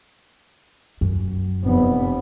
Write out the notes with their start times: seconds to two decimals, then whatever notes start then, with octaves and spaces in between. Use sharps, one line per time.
1.01 F#2
1.65 F1 B3